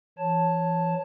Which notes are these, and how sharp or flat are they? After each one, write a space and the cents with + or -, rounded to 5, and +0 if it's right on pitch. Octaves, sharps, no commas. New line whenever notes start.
E3 +35 C#5 +0 A5 +0